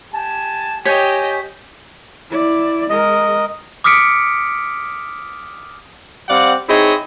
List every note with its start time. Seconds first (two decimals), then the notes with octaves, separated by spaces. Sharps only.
0.14 G4 G#5 A5
0.85 G4 C#5 D#5 G5 G#5 C#6 G6 B6
2.30 E4 D5
2.90 G#3 A#4 D#5
3.84 D6 D#6 F6 B6 C#7 D7
6.28 G3 C4 D5 F5 F#5
6.68 C4 D#4 E4 G#4 C#5 D#5